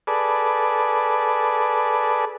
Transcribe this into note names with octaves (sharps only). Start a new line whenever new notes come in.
G#4 A4 B4 D5